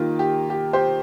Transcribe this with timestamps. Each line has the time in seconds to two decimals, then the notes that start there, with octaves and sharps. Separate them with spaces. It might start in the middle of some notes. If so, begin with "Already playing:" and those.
Already playing: D#3 A#3 D#4 F4 G4
0.19 G4
0.50 G4
0.73 G4 C5